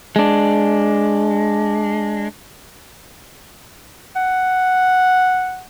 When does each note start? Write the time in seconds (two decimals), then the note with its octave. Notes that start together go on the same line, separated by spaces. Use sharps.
0.16 G#3 D4
4.16 F#5